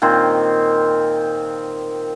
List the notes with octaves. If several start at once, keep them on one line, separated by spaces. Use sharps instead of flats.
A#2 D#3 C4 C5